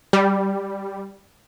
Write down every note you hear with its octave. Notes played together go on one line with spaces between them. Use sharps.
G3